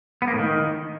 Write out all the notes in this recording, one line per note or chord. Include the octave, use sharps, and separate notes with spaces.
B3
A#3
A2
D#3